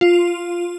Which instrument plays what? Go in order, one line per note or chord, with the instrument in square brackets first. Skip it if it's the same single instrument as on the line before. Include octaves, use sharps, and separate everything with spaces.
[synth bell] F4